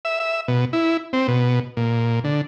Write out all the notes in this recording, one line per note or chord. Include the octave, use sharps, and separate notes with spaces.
E5
E5
B2
E4
C4
B2
A#2
D3